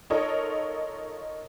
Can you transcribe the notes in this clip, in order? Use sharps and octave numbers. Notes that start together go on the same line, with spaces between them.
D#4 F4 A4 A#4 C#5 D#5